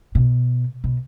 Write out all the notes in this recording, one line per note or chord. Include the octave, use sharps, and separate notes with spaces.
B2
B2